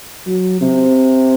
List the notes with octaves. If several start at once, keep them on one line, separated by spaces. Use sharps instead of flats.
F#3
C3